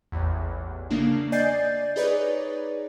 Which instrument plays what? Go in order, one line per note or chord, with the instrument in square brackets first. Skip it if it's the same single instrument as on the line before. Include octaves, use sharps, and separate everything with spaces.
[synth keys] A1 E2
C#3 A#3 D4
D5 D#5 G#5 G6 A6 C7
D#4 G#4 B4 C#5 D5